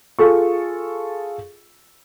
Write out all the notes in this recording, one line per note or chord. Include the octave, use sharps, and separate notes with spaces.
F4 G#4 A4 C#6